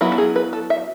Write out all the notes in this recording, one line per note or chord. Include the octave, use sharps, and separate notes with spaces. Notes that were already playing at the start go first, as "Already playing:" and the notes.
F#3 B3 E4 F#4
A4
G#4
B4
A4
E5